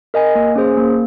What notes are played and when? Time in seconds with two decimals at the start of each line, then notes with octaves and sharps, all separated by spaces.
0.14 A#4 D#5 G#5
0.35 A#3
0.56 C#4 G#4 C5
0.77 A#3